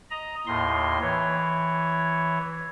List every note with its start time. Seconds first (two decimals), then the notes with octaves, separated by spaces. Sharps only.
0.10 D#5 A#5
0.47 D#2 A2 C6
1.01 E3 C#5